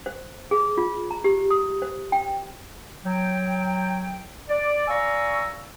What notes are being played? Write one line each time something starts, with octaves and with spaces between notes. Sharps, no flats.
C5
G#4
F4
A#5
G4
D#6
C5
G5
F#3 G5
D5
D5 F5 G#5 A#5 C#6 E6